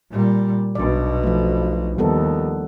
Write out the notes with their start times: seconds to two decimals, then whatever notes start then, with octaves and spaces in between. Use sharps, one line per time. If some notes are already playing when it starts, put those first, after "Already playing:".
0.11 A#2 G3
0.75 B1 B2 D4 D5
1.23 F3 A3
1.98 D#2 G3 B3 A4